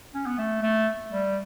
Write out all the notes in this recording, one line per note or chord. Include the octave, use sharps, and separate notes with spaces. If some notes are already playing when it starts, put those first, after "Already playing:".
C#4
B3
A3
A3
G3